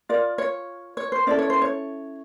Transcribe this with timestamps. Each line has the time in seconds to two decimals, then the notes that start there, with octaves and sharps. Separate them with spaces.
0.09 F4 A#4 D5
0.38 C#5
0.97 C#5
1.12 C5
1.27 C#4 E4 A4 D5
1.39 C#5
1.50 C5
1.62 C#5